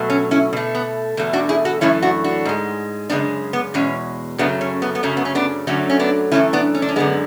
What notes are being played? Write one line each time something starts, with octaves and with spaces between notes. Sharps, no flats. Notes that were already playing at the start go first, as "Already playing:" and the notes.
Already playing: B2 F#3 A3
C#4
C#4 E4
B2 A3
B3
E2 B2 A3
D4 F#4
E4 G#4
F#4 A4
F#2 E3 A3 C#4 E4
D4 F#4
D4 F#4
G#2 G#3
F#2 C#3 G#3 B3 D4
B3
E2 B2 G#3 C#4
F#2 C#3 F#3 A3 B3 D4
C#4
B3
B3
F#2 C#3 F#3 A3 C#4
B3
C#4
B3 D4
F#2 D3 F#3 A3 C#4
C#4
B3 D4
F#2 E3 A3 C#4 E4
B3 D4
C#4
D4
C#4
F#2 D3 G#3 B3